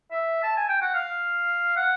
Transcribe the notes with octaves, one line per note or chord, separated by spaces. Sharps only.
E5
A5
G#5
G5
F#5
F5
F#5